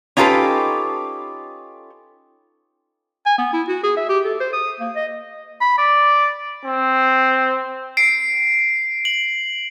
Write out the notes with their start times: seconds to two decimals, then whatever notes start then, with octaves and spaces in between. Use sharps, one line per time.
0.17 C#4 D#4 F4 G4 A4 B4
3.26 G#5
3.38 B3
3.53 E4
3.68 F#4
3.83 G#4
3.97 E5
4.09 G4
4.25 A4
4.40 C5
4.53 D#6
4.80 A#3
4.95 D#5
5.61 B5
5.78 D5
6.65 C4
7.97 C7 D7
9.05 F#7